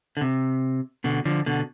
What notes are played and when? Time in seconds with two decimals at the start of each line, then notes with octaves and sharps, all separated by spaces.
0.17 D3
0.21 C3
1.04 B2 D3
1.25 D3 F3
1.46 B2 D3